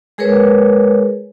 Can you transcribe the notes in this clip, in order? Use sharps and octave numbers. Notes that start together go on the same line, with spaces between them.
G#3 G#4 A#4 B4 C#5